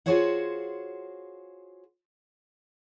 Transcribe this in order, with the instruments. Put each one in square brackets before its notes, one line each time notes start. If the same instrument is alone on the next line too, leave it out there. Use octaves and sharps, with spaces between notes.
[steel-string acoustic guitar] F4 F#4 G#4 C5 C#5 F#5